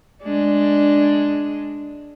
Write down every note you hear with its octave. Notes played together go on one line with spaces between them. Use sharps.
G#3 D4